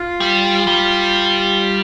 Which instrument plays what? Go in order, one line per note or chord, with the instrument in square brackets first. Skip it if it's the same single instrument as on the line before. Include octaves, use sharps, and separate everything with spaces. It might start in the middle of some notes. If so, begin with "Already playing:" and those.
Already playing: [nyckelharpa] F4
[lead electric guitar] G3
G3